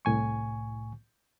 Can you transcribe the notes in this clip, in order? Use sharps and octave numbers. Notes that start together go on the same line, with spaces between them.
C2 A2 G#5 C#6